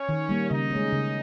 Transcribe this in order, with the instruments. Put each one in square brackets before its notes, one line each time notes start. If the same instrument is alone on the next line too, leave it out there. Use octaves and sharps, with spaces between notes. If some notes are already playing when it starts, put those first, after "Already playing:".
Already playing: [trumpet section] C#4 C#5
[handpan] D#3
G3 A#3
[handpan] C#3 [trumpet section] D#4 D#5
[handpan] G#3 C#4
C#3